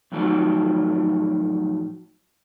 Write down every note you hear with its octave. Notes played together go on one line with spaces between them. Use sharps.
F2 A2 D#3 F#3